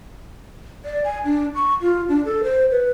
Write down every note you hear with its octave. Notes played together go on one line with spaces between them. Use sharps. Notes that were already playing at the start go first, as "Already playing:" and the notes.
D5
G#5
D4
C#6
F4
D4
A4
C5
B4